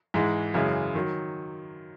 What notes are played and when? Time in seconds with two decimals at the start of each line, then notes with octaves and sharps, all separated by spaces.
0.14 G#2 E3 G#3
0.54 F#2 C#3 E3 G#3
0.95 D#3 F#3